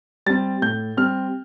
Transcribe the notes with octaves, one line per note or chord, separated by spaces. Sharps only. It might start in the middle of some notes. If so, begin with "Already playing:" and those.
G3 C4 A6
A2 G6
G3 C4 F6